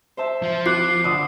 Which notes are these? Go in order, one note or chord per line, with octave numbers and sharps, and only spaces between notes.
C5 E5 A5
F3
F4 D6 F#6 C7
D3 D6 D#6